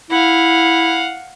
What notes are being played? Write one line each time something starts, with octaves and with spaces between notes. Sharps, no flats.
E4 F5 F#5